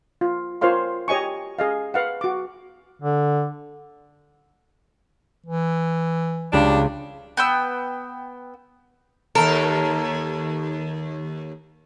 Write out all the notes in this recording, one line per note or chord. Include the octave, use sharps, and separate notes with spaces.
F4
F4 A#4 C5 C#5 F5 C6
G4 C#5 D#5 G#5 C#6
G#4 D#5 F5
B4 F5 F#5
F#4 D6
D3
E3
C#2 G3 D4
B3 G5 E6
D#2 A4 A#4